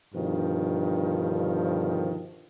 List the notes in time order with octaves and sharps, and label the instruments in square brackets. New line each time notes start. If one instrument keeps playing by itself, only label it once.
[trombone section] G2 B2 D3 D#3 F3